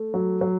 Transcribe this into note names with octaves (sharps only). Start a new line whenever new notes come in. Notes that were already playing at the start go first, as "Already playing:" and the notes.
Already playing: A3
F#3
F#3